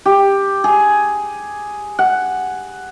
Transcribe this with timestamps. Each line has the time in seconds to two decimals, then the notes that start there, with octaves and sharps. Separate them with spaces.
0.06 G4
0.64 G#4
1.99 F#5